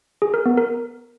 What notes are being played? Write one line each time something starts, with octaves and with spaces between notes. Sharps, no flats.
G#4
A#4
B3
A#4